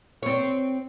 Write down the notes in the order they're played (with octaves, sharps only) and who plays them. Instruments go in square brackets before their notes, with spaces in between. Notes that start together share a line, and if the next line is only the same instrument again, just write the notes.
[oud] C4 C#5